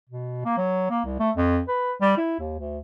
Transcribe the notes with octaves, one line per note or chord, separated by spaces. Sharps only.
B2
A#3
F#3
A#3
C2
A3
F2
B4
G3
E4
D#2
D2